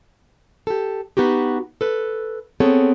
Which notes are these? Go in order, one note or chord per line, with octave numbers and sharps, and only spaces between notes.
G4 A4
B3 D#4 F#4 G4
A4 B4
B3 C4 G#4 A4 C#5